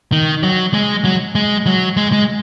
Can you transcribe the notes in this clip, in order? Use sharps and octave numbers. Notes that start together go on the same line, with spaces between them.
D#3
F#3
G#3
F#3
G#3
F#3
G#3
G#3